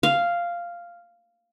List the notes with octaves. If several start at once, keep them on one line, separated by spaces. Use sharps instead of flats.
F5